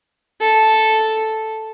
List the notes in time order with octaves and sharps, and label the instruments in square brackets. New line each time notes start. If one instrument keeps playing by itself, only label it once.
[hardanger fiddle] A4